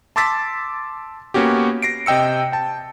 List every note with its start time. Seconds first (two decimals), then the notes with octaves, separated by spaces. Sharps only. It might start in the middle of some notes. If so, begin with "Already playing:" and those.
0.16 A5 C6 D6 E6 A6 B6
1.34 A#3 B3 C#4 F#4 G4
1.82 A#6 C7 D7
2.06 C3 D#5 G5 E6 C#7
2.52 G5 A5